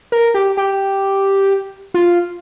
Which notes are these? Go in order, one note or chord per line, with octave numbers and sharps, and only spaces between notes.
A#4
G4
G4
F4